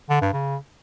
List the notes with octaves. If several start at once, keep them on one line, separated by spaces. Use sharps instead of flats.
D3
G2
C#3